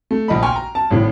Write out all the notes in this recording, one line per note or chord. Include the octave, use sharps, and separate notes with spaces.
A3
A#1 D#5 B5
G5 G#5 C6 C#6 F6
A#5
A5
G#1 A2